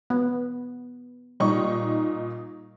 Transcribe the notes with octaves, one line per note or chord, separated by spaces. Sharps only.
B3
A#2 G3 D#4 C#6